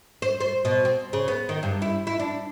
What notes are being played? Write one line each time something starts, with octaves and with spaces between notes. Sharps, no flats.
C5
C5
B2
C4
C#3
B3
D#3
G2
E4
E4
D4